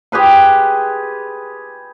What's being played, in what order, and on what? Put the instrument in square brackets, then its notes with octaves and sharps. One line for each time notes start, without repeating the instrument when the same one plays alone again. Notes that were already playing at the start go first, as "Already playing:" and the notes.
[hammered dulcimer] G4 G#4 B4 C6